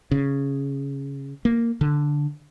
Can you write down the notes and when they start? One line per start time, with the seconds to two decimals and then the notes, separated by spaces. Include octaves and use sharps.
0.11 C#3
1.45 A#3
1.81 D3